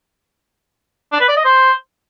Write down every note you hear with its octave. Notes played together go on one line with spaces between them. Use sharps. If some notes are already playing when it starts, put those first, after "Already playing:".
D4
B4
D5
D#5
C5